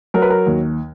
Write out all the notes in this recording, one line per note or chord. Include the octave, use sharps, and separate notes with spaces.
F#3 A#4
B4
A#4
D#2